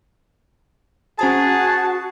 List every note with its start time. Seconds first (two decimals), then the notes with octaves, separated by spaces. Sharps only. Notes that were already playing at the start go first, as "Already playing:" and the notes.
1.19 C#4 F#4 G#4 C5 A5 A#5